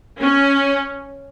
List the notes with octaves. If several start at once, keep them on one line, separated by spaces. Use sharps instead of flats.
C#4